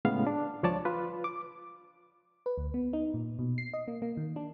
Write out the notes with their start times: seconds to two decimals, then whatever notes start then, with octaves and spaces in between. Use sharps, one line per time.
0.05 A2 C#3 G#3 B3 F5
0.27 D4
0.63 C#2 F3 C#5 D5 A5
0.85 F4 B4
1.24 D6
2.46 B4
2.58 D2
2.74 B3
2.93 D#4
3.14 A#2
3.39 B2
3.58 C7
3.73 D#5
3.88 A#3
4.02 A#3
4.17 D#3
4.36 D4